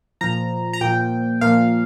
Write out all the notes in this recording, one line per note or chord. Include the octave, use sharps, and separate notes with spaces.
A#2 F3 A#5
A#5
A#2 F3 G5
A#2 F3 F5